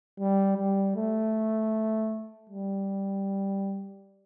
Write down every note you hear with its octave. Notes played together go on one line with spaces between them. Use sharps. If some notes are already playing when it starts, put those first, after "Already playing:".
G3
G3
A3
G3